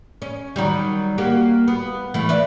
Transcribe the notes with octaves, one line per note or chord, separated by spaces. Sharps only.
C#4
D#3 F#3 G3
A#3 F#4 G4
B3
E3 A3
B4 D5 E5